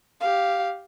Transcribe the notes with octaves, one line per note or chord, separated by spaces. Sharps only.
G4 F5